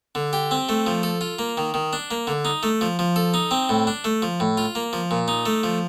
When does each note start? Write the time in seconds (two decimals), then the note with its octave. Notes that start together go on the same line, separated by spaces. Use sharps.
0.15 D3
0.33 G4
0.51 C4
0.69 A3
0.87 F3
1.03 A4
1.21 F4
1.39 A#3
1.57 D#3
1.74 D#3
1.93 D4
2.11 A#3
2.27 D3
2.45 D#4
2.63 A3
2.81 F3
2.99 F3
3.16 A4
3.34 D#4
3.51 C4
3.69 A2
3.87 D4
4.04 A3
4.22 F3
4.40 A2
4.58 F4
4.75 A#3
4.93 F3
5.11 A#2
5.28 D#4
5.46 A3
5.63 F3